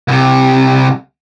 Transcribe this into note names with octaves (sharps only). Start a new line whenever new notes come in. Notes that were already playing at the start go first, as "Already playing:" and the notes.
C2 C3